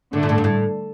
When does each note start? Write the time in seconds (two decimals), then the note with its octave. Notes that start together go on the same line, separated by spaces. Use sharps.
0.12 A2 D3 A3 D4
0.23 A#2
0.29 A2
0.38 G2
0.44 A2